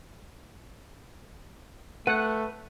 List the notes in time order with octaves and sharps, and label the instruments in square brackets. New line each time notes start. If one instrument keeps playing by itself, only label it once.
[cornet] A3 [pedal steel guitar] B4 F#6 [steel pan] F#5